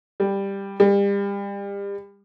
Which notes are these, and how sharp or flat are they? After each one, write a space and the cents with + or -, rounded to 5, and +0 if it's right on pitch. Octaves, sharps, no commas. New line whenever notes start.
G3 +10
G3 +35